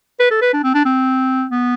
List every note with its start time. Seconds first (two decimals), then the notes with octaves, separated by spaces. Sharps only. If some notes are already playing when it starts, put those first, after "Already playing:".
0.19 B4
0.31 A4
0.42 B4
0.53 D4
0.63 C4
0.74 D4
0.85 C4
1.51 B3